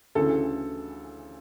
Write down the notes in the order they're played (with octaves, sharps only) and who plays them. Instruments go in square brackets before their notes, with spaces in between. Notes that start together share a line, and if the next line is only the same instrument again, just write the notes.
[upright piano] D2 C#3 E3 A4